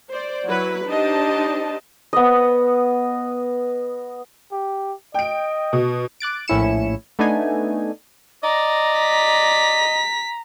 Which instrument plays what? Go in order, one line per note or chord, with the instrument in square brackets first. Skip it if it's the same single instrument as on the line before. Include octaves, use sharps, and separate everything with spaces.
[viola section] C5 D5
F#3 E4 F#4 B4
D4 D#4 G4 C5 D#5 A5
[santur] B3 D#5
[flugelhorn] G4
[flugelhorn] D#5 [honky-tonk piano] G5 D7
[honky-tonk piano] B2
[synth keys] D6 F#6 A6 D7
A#1 A2 C#4 E4 C#7 E7
A3 B3 D4 D#4 G#5
[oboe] D5 [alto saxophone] D#5 [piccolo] A#5
[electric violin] B6